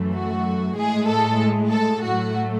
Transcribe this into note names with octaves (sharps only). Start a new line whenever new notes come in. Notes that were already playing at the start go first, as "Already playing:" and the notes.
Already playing: F#2 E3 A3
F#4
A2 G#3 G#4
A4
A4
A2 F#3 A3 F#4